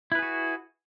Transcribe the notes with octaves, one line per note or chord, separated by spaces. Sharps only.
E4 F#4 G#4 B4